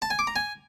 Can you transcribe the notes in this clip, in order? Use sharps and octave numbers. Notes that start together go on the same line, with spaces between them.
A5
G#5
D6
A#5
G#5